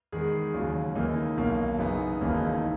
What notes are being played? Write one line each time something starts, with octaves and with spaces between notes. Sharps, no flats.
E2 D#3 G#3 G#4
D#2 C#3 F#3
D#2 C#3 E3 A#3 D#4
B1 B2 A#3
F#2 C#3 E3 B3 D#4
E1 D#2 C#3 E3 A#3 C#4
D#4
D#4